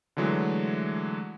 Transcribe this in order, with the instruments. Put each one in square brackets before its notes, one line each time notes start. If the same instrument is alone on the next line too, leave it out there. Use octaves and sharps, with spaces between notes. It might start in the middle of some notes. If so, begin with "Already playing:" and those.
[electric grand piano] D3 E3 F#3 G#3 A3